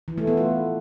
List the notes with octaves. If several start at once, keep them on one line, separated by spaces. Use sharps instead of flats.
E3
A3
B3
F4